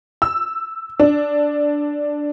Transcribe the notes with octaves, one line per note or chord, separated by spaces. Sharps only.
E6
D4